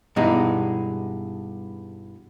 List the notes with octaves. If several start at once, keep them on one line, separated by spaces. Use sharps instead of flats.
G2 B2 E3 G#3 D#4